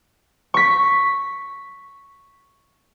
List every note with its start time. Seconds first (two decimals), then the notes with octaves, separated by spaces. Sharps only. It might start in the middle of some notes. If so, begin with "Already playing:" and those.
0.54 C#6 B6